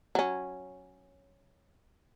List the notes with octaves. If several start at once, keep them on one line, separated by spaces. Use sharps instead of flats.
F#3 C#4